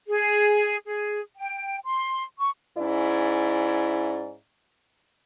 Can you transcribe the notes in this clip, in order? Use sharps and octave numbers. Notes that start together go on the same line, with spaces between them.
G#4
G#4
G5
C6
C#6
G#2 C#4 E4 D5